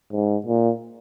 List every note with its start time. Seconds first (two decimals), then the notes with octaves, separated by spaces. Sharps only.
0.12 G#2
0.47 A#2